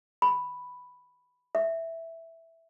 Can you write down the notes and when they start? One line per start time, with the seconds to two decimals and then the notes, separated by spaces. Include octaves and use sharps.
0.22 B5
1.55 E5